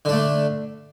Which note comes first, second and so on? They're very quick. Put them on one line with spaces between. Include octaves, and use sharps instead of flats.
D3 D4 A3